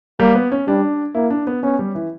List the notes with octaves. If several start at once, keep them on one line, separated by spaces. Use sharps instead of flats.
G3 A#3
B3
C#4
G3 D4
A#3 E4
D4
B3
B3 C#4
G3
E3